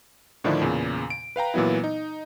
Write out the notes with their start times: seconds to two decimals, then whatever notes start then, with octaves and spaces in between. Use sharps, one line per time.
0.44 A2 D3 D#3 F3 D4 E4
0.62 E2 A#2 C#3
1.10 D7
1.36 B4 F5 G5 A#5
1.54 A#2 E3 F#3 B3 E4
1.84 D#4